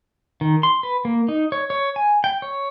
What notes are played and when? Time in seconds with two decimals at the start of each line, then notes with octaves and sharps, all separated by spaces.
0.41 D#3
0.63 C6
0.83 B4
1.05 A#3
1.28 D#4
1.52 C#5
1.70 C#5
1.96 G#5
2.24 G5
2.42 C#5